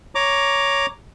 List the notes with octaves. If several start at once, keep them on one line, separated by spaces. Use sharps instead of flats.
C#5 A#5 D6